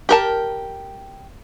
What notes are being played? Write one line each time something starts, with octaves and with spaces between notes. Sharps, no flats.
G4 A#4 A5